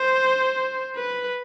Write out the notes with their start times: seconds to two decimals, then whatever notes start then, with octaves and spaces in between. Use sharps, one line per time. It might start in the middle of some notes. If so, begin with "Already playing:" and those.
Already playing: C5
0.96 B4